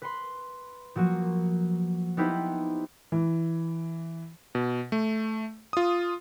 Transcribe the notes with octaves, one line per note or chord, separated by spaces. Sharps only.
B4 B5 C6
F3 F#3 A#3 F#4
B3 D#4 E4 G4 B4 C5
E3
B2
A3
F4 D#6